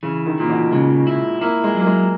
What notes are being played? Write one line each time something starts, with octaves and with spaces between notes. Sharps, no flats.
C#3 E3
D#3
A#2 E3
B2
C#3 G#3
E4
A#3 E4
G#3
F#3
A#3
G#3